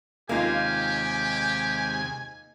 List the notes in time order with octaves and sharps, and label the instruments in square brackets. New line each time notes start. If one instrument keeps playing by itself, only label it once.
[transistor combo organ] D#2 C3 G#3 [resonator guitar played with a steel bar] A#3 D#4 F4 [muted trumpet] G4 [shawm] G#5